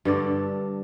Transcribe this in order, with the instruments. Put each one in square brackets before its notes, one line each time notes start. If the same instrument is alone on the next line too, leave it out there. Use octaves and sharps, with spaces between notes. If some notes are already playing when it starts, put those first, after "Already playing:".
[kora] G2 D3 D5